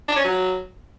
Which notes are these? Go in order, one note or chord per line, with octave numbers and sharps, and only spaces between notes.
D4
C#4
F#3